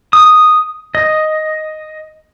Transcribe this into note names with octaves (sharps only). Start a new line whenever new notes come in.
D#6
D#5